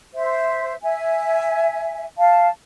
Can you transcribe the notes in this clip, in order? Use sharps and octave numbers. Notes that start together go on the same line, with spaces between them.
C5 E5
E5 G#5
F5 A5